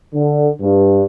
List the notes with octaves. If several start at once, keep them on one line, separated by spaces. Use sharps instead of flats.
D3
G2